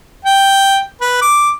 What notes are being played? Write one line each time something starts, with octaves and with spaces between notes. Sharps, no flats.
G5
B4
D6